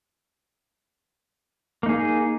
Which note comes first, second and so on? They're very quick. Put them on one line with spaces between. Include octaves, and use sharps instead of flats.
A#3 D#4 G#4